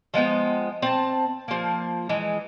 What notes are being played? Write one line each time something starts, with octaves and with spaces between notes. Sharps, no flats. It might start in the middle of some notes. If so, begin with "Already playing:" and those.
F3 G#3 B3 G5
C4 A5
F3 A#3
E3 G#3